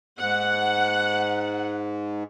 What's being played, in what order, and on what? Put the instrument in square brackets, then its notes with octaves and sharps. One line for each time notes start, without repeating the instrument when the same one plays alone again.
[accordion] G#2 [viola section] F#5